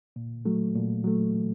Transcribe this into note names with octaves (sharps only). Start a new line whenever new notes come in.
A#2
F#3 A3
A#2
F#3 A3